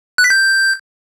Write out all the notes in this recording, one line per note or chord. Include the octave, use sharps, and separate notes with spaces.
F#6
B6
G6